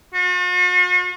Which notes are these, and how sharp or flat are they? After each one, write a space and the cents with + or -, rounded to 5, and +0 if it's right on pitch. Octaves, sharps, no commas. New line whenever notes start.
F#4 -45